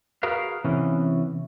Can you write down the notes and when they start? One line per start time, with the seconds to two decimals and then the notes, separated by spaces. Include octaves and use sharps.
0.23 F#4 G#4 A#4 B4 F5
0.64 C3 E3 B3 C#4